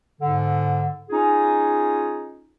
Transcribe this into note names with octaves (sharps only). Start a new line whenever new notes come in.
G#2 D3
C#4 D#4 F4 G#4